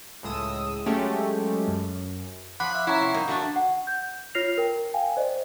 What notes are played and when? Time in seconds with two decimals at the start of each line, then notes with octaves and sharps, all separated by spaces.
0.23 C#2 A2 G#3 D#6 E6
0.86 F#3 G#3 A3 C#4 G4
1.68 F#2
2.60 F3 F#5 B5 D6 F#6
2.75 E5
2.87 C#4 E4 F#5 A#5
3.01 C3
3.14 A#3 D#4
3.28 D3 A3 D4 F#4
3.56 F#5
3.87 G6
4.35 F4 C#5 F6 A#6 C7 F7
4.57 A#4 G5
4.94 F5 G5 G#5
5.17 C5 D5 D#5